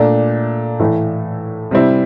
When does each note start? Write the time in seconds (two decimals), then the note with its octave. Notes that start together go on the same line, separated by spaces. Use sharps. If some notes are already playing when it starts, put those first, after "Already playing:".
Already playing: A#2 A3 D4
0.79 A2 E3 A3 E4
1.71 C3 G3 C4 E4